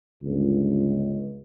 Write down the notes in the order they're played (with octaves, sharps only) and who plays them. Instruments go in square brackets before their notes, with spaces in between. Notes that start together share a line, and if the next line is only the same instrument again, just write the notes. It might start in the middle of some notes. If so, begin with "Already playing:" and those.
[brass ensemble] G1 C#2